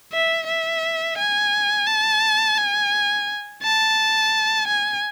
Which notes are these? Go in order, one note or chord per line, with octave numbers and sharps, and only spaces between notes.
E5
E5
G#5
A5
G#5
A5
G#5